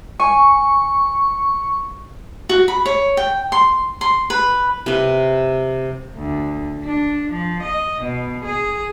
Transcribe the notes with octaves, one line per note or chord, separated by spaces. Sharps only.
G#5 C#6
F#4
B5
C#5
G5
C6
C6
B4
C3 B4
D2
D4
F3
D#5
B2
G#4